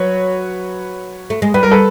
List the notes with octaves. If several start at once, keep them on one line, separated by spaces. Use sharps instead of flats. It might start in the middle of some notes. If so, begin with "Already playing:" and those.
Already playing: F#3 B4 C#5
A3
G#3
G3 B4
A#4
A4 B4